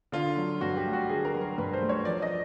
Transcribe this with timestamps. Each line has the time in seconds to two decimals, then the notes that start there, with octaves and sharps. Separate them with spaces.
0.12 D3 F4
0.37 F#3
0.61 G2 F#4
0.77 G4
0.86 A3
0.93 F#4
1.09 D3 G#4
1.25 A#4
1.34 F#3
1.41 A#4
1.58 G2 B4
1.73 C5
1.82 A3
1.89 C#5
2.05 F3 D5
2.22 D#5